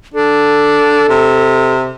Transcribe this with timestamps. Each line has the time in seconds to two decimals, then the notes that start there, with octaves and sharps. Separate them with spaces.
0.14 D4 A4
1.09 C3